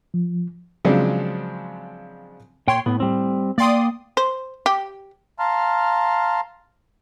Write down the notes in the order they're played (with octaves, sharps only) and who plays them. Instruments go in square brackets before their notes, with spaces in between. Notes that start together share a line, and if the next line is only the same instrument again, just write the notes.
[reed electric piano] F3
[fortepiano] C#3 F3 F#3 G#3 C4 D4
[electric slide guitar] A#2 G5 [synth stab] C#5 C6
[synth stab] A2 [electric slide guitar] B3
[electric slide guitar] G3 C4
[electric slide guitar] A#3 G5 [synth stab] D5 C6 D#6
[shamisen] C5
G4
[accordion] F5 A5 A#5 C6 F6